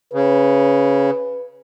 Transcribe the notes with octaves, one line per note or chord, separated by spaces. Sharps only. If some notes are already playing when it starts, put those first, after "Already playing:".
C#3 B4